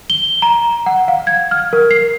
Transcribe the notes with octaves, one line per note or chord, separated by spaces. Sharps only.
G7
A#5
F#5
F5
G#6
F6
A#4
C7